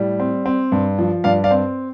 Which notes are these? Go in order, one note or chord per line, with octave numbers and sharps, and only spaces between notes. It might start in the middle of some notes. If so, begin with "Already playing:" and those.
Already playing: A2 G3
C4
C4
G2
F3
G2 D5 F5
D5 F5
C4